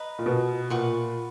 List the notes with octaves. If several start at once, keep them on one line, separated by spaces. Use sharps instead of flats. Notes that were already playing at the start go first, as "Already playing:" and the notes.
Already playing: B4 D#5 A#5
A#2
B2
A#2 B4 F#5 C#6